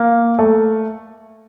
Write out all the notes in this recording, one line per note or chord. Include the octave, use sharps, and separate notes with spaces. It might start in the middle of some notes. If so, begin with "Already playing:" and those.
Already playing: A#3
A3